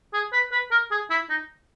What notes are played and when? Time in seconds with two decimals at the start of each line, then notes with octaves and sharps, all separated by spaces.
0.14 G#4
0.33 B4
0.52 B4
0.71 A#4
0.91 G#4
1.10 E4
1.29 D#4